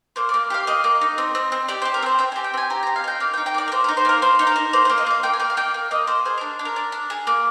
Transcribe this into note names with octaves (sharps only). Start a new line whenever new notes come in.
A#3 C5
A#3 D5
G4 F5
A#3 D#5
A#3
D#4
C4
C4
C4
G4 D5
G4 C5
A#4
C4 C5
C4 G5
G4 G#5
G5
C4 G#5
G4 A#5
C4 A#5
F5
D#4 G5
A#3 F5
G5
D#4
G5
A#3 D5
A#4
A#3 C5
D#4 A#4
C5
A#3 A#4
A#3 C5
D#4
A#4
D#4
A#3 C5
A#3 C5
D#5
A#3 F5
A#3 G5
G#5
A#3 G5
F5
A#3 G5
A#3
A#3 D#5
A#3 C5
G#4 C5
D4 A#4
D4
A#4
D4
D4
G#4
A#3